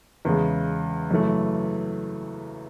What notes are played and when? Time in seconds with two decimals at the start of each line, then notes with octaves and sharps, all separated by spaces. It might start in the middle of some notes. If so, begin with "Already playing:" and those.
0.25 E2 C#3 G#3
1.11 F#2 C#3 E3 A3